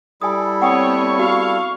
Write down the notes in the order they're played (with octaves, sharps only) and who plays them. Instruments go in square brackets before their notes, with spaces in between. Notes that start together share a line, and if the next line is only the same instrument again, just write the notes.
[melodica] G3 E4 A4 [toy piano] G#5 D#6
[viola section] B3 C4 C#5 [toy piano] F#5 G5 D#6 [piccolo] C#6
[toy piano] F#4 [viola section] F5